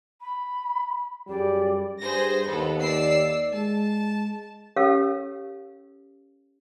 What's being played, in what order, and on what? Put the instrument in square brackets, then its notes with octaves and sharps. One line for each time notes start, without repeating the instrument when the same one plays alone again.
[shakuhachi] B5
[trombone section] F#2 G3 G#4 [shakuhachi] D5
[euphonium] G2 [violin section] G#4 C5 A#6
[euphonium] D#2 [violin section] B3 A4
[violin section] D5 E6 C7
[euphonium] G#3 [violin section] A5
[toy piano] C#4 G4 A4 A#4 C#5 F5